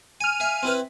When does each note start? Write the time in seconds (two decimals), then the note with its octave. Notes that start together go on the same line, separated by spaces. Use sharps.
0.21 G#5 F6 D#7
0.40 E5 F5 G#5
0.63 C4 E4 B4